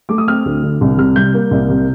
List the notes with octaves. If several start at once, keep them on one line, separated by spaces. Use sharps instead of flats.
A3 D6
D#6
C4 F6
D2
D3
C2
C3 F6
G3 G6
A#3
C2
C3